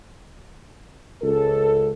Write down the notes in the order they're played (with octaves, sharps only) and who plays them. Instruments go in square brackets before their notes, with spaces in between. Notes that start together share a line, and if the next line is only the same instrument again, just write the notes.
[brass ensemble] C#2 A4